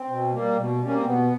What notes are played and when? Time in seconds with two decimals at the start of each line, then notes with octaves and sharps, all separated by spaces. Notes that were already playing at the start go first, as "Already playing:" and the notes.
Already playing: C4
0.09 B2
0.32 G3 A#3
0.56 B2
0.80 G3 A#3 C#4
0.94 C4
1.04 B2 B3